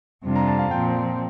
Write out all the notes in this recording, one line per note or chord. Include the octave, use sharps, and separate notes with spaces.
F2 C3 G3 D4 F4
A#5
A5
F5
A#2 F3 C4 G5